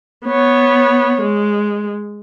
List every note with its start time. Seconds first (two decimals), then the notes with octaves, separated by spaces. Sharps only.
0.25 B3 C#5
1.21 G#3